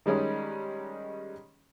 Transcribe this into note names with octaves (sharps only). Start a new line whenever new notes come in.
D#3 G3 G#3 C#4 D#4